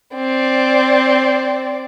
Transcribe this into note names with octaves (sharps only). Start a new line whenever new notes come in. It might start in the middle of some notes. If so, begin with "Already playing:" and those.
C4 D5